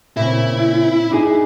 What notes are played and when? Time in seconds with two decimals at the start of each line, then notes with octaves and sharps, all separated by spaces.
0.17 A#2 C#3 C4 E4
1.11 D4 D#4 G#4